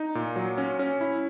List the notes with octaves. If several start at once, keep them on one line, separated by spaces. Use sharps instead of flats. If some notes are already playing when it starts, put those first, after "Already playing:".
Already playing: D#4
A#2
F#3
C#4
C#4
E4